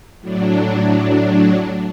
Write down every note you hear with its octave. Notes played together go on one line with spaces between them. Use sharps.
A2 F#3 D4